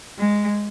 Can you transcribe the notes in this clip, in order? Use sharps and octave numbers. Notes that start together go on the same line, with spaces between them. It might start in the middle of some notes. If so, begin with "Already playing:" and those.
G#3